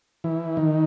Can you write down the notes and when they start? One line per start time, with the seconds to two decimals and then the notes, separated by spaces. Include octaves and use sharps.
0.24 E3
0.57 D#3